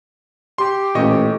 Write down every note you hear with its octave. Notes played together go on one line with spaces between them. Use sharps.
G4 C6
A1 A#2 D#5 C#6